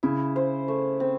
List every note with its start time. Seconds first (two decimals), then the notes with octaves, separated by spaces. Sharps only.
0.03 C#3 E4
0.36 C5
0.68 A3
1.00 C4